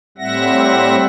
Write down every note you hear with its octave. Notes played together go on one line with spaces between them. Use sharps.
A2 G3 C4 E5 F#5 A#6